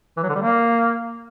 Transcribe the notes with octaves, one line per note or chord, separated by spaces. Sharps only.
E3
F#3
D3
G3
A#3